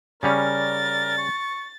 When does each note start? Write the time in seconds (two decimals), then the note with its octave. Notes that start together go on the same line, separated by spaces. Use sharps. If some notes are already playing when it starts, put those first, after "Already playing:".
0.23 C#3 G3 C#4 A#4 D5 A6
1.18 C#6